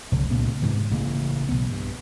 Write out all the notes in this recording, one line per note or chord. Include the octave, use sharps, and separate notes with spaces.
F1 C2 D3
C#2 A#2 C#3 B3
G#2 C3 E3
A1 C#3 A#3
B1 B3
G2